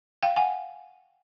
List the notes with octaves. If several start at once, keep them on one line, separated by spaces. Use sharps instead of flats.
F5 G5
F#5 G#5